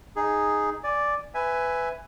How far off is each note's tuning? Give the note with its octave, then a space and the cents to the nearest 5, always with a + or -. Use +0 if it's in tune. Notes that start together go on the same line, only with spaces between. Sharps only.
D#4 +0 G#4 +0
D5 +0 G#5 +0
B4 +15 E5 +0 G#5 +0